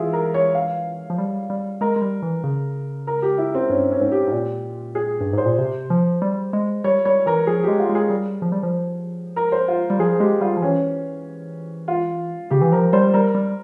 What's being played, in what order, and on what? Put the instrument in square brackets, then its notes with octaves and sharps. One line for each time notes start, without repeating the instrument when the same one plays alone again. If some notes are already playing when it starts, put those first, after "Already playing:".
Already playing: [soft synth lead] E3 [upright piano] E4 F4 G#4
[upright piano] A#4
C#5
F5
[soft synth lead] F3
G3
G3
[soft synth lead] G#3 [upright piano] A#4
[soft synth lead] G#3
G3
E3
C#3
[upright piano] A#4
G4
E4
C4
[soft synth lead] G2 [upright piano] C#4
[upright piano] C#4
[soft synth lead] G#2
[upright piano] G4
[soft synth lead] G#2
A#2
[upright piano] G#4
[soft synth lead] G2
[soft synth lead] G#2 [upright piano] C5
[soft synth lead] A#2
C3
F3
G3
G#3
[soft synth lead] G3 [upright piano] C#5
[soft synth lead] G3 [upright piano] C#5
[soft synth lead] E3 [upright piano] A#4
[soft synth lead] F3 [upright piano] G#4
[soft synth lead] G#3 [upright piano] G4
[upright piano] F4
[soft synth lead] G#3
[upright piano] G#4
[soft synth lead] G3
F3
G3
F3
[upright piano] A#4
C5
F4
[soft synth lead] G3
[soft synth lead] F3 [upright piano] G#4
[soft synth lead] G#3 [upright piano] G4
[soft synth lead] G3 [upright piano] F4
[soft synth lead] F3
[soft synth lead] E3 [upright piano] C#4
[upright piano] F4
[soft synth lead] C#3 [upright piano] G4
[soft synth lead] E3
[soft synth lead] F3 [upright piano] A#4
[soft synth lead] G3 [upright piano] C5
[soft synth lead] G3 [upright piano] A#4
[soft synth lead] G3